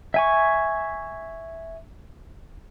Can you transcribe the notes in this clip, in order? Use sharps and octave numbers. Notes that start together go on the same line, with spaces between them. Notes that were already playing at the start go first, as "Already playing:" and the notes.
E5 G#5 C#6